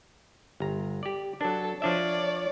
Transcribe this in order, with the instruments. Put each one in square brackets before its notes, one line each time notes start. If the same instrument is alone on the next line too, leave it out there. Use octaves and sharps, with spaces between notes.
[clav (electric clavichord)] G1 A#5
G4 D5
[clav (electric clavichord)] F#3 D4 [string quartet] A4
[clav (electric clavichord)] F3 D4 E5 [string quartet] C#5 D5